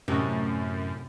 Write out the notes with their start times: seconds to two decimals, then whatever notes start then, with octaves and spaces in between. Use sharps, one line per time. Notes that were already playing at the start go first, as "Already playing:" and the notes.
0.08 F#2 A2 C3 D#4 F#4